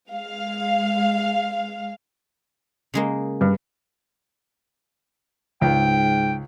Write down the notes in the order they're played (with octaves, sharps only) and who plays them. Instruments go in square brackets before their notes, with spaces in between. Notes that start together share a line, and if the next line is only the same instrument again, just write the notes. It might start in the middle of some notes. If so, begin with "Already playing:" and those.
[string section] G#3 F5
[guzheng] C#3 G#3 A#3
[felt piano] G2
[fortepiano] C#2 [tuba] G#2 [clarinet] G5